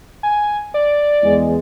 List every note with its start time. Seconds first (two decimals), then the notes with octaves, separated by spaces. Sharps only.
0.23 G#5
0.74 D5
1.23 E2 G#3